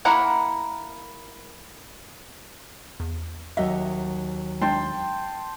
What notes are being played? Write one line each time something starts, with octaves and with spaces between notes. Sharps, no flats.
A#3 E4 A#4 F#5
E2
D#2 F#3 D#5 E5 E6
G#3 D4 G5 A5 C6